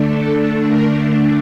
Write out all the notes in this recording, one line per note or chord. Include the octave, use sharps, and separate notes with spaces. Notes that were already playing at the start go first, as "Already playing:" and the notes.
Already playing: D3 A3 D4
A4
A#4